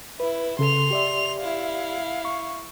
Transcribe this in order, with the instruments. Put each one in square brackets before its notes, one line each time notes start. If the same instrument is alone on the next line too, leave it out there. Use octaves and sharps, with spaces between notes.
[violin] E4 [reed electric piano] B4
[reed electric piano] C#3 A4 [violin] C6 F7
[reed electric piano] G4 D5 E5
[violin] E4 F5
[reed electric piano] C#6